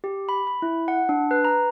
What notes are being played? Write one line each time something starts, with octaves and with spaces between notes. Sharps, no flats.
G4
B5
B5
E4
F#5
D4
B4
A#5